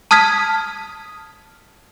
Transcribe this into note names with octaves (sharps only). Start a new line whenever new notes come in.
A5 D#6 F6 G#6 B6